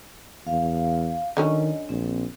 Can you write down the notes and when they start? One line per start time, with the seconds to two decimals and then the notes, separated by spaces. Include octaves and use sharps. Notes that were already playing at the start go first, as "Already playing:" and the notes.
0.47 E2 F5
1.37 D3 D#3 F#3 C#4 D#5
1.89 A#1 C4